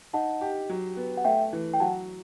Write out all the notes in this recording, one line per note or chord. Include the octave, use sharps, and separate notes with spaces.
D#4 F#5 A5
G4
F#3
B3
F#5
A3 E5 G5
E3
G5
F#3 F#5 A5